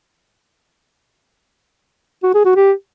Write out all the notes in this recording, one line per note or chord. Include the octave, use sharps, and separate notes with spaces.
F#4
G#4
F#4
G4